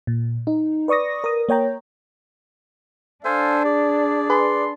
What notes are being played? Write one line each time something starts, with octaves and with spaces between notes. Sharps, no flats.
A#2
D#4
B4 D5 C#6 D#6 A#6
A#4 D#6
A#3 C#5 G5 A#5
D4 A4 C5 F5 G#5
G#4 D5
G#4 B4 C6